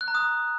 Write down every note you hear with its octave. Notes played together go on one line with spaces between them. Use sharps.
F#6
A#5
D#6